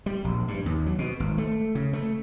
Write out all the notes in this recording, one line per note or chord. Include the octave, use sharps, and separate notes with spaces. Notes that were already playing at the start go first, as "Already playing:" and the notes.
G3
A#1
G2
D#2
F#3
B2
G#1
A3
C#3
A3